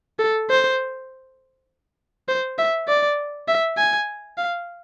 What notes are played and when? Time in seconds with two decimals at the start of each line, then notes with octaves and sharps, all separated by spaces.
0.19 A4
0.50 C5
2.28 C5
2.58 E5
2.88 D5
3.48 E5
3.78 G#5
4.37 F5